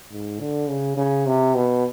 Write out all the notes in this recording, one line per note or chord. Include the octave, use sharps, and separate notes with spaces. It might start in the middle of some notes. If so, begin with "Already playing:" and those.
G#2
D3
C#3
C#3
C3
B2